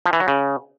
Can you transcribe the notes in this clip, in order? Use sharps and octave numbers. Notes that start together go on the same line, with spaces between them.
F3
E3
F#3
C#3